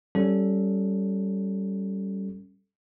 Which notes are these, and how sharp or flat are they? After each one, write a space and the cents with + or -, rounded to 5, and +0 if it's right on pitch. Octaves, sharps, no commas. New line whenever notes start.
G3 -15 C#4 +0 A4 +0